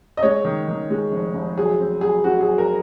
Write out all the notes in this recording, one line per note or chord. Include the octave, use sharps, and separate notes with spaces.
D#5
G#3 C#5
D#3
D#3
G#3
F1
F1
F#3 G#4
C4
F#3 G#4
C4 F#4
G#4
F#3
A#4